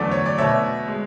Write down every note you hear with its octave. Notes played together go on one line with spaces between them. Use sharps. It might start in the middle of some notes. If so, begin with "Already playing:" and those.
Already playing: E2 D3 F#3 A3 D5
C#5
D5
B2 A3 C#5 E5
G#3